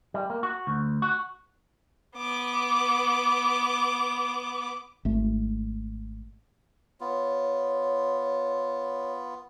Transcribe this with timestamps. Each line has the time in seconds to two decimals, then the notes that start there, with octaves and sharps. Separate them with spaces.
0.14 G3
0.30 A#3
0.43 F#4
0.67 D2
1.02 F#4
2.17 B3 D6
5.05 G#1 A3
7.00 B3 F4 C#5